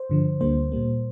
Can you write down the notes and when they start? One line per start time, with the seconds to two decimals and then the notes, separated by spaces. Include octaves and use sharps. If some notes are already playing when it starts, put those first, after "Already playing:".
Already playing: C5
0.10 G2 D3 F3
0.40 D2 D3 G3 A#3 C5
0.72 A#2 G3 A#3